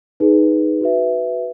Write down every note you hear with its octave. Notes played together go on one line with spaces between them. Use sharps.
D#4 G#4 B4
F#4 B4 E5